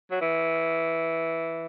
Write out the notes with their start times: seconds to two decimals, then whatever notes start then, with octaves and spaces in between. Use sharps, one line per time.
0.11 F#3
0.21 E3